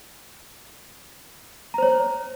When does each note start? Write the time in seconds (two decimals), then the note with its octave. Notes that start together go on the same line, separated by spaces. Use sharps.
1.74 A#5
1.78 C5
1.82 C#5